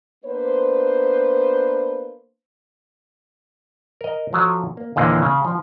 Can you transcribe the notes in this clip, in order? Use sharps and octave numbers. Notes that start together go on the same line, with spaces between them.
A#3 B3 D4 B4 C5
A#4 D#5
F3 F#3 A4
A#3
D#2 A#2 D3 E3 A#3
C#3
F3